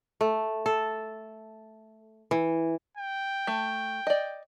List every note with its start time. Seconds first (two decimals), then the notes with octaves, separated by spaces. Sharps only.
0.21 A3
0.66 A4
2.31 E3
2.97 G5
3.47 A3
4.07 D5 D#5